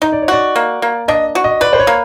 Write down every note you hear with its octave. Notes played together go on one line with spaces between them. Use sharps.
D#4 D#5
D5
C#5
F#4 D5
A#3
A#3
D4 D#5
F#4
D#5
B4 D5
C5
C#5
A#3